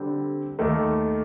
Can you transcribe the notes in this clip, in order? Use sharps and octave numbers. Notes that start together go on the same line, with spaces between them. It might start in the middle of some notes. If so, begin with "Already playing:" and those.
Already playing: D3 G3 C4
D#2 D#3 A3